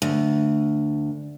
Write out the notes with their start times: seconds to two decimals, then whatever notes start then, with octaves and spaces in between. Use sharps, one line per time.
0.02 D2